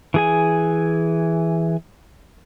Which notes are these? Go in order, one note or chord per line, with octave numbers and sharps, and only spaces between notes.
E3 G#4 G#5